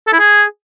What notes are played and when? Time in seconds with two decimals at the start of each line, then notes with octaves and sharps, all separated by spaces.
0.07 A4
0.13 E4
0.20 G#4